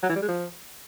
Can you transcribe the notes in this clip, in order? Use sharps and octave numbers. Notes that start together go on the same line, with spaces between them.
F#3
E3
G3
G#3
F3